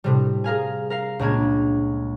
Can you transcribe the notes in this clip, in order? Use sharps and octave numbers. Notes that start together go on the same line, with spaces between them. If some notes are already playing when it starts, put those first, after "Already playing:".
A2 C3 G3
G#4 A#4 F5 G#5
A#4 F5 C7
C#2 A#2 G#3 A#3 D4 G#6